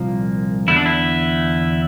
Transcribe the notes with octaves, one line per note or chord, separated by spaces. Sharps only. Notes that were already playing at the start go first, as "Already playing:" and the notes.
Already playing: C2 A#2 F3 A#3
E2 D3 A3 E4
D4
E4